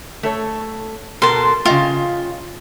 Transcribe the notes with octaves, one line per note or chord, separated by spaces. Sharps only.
A3 A4 C#5
B2 A4 A#4 A5 C6
C#3 F4 D#5 G5